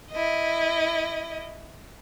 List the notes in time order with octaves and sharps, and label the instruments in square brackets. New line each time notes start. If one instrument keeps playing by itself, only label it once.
[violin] E4 D#5